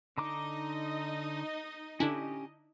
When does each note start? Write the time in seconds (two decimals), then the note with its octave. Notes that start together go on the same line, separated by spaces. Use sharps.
0.18 D3 D#4 D#5 A#5 D6
2.00 D3 C#4 D4 E4 G4